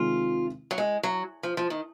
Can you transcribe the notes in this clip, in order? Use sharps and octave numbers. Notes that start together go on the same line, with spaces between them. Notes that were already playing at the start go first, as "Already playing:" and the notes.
Already playing: C3 D#3 G#3 C4 F4
F#3
G#3
F#3
F3
F3
D#3